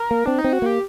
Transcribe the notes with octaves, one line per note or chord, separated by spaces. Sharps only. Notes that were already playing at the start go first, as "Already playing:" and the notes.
Already playing: A#4
A#3
C4 D4
D#4
C4
F#4
A#3 G4